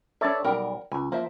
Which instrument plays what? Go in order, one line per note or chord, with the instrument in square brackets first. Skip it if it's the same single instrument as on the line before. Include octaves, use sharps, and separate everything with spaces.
[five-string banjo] D4 B4 E5 [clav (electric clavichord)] A4 C#5 D5
[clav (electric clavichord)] B1 G3 [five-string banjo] A#4 F#5 G5
[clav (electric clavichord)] C#2 [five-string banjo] G#5
[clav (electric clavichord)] F3 [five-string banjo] A#3 C5 E5